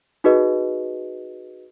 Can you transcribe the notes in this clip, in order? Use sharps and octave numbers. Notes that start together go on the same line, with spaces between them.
D#4 F#4 G#4 B4 D#5